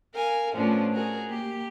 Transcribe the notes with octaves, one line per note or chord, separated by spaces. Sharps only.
A#4 F5 G#5
A2 F3 B3 C#4 D4 F4
F#4 G#4 A#4
A#3 G4